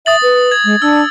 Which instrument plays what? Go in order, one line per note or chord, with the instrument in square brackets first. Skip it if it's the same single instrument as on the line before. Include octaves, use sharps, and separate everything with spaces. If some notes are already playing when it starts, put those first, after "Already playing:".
[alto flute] E5 [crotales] D#6 A6 F#7
[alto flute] B4
[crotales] G#6
[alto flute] G#3
[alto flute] D4 [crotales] E6